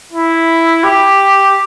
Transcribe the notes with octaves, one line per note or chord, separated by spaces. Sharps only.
E4
G4